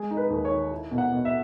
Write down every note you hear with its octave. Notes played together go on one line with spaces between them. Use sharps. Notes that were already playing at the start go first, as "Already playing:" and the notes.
Already playing: G#3 G#4
D#4
B4
D#2
C#5
D#3
E4
B2
F#5
B2
E5